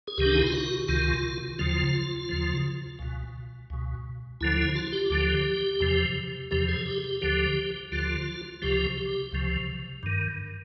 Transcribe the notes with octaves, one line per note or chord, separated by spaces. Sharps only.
G#4
C#2 C3 D#3 G4
D4
D#4
E4
F4
F#4
C#2 C3 D#3 F4
D#2 C#3 F3 F4
D#2 C#3 F3
C#2 B2
C#2 B2
D2 D3 F3 E4
E4
F4
G4
D2 D3 F3
E2 C3 F3
E2 C3 F3 G4
G#4
G4
G4
D2 D3 F3 G4
D2 D3 F3 F4
C#2 C3 F3 G4
G4
C#2 C3 F3
G2 D#3